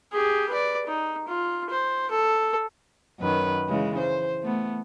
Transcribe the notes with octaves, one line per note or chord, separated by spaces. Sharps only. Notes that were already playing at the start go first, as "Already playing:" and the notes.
G4 G#4
B4 D5
D#4
F4
C5
A4
F#2 D#3 B4
C#3 E3 G#3
C5
A3 B3